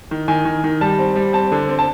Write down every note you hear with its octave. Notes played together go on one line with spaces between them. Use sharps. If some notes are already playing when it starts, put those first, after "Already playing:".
D#3
D#3 G#5
D#3
D#3
G3 A5
C4
G3
C4 A5
D3
C4
A5